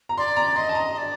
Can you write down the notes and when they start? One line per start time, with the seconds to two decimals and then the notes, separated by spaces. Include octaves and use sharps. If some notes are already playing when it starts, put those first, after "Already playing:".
0.09 A#5
0.17 D5 C6
0.36 A#5
0.56 D#5 C6
0.69 A5
0.75 A#5
0.93 D#5
0.98 D5